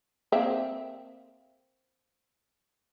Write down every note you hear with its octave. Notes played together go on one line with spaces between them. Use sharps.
A#3 C4 E5